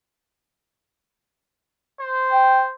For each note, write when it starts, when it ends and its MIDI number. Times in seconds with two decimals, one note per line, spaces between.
2.00 2.74 72
2.32 2.62 79